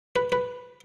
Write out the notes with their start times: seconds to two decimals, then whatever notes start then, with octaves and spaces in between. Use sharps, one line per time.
0.16 B4
0.32 B4